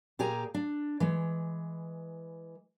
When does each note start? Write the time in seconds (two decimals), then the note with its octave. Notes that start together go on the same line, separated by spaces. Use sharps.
0.19 A#2 G4 G#4 G#5 A#5
0.54 D4
1.00 E3 G#3